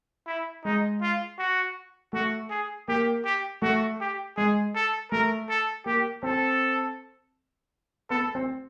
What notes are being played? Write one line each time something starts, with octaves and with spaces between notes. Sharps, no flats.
E4
G#3 D#4
F4
F#4
A3 F#4
G#4
A#3 G4
G4
A3 F#4
G4
G#3 G#4
A4
A3 A#4
A4
A#3 G4
C4 A4
B3 A4
C4